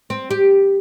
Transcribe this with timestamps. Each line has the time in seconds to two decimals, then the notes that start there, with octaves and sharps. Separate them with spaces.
0.10 C4
0.31 G4